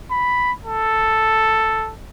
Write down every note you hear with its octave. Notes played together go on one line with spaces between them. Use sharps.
B5
A4